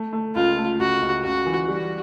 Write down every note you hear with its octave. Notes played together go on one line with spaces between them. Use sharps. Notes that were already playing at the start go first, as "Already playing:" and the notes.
Already playing: A3
A3
C#2 F4
A3
C#2 F#4
C#2
C#2 F#4
E3
G3 F#4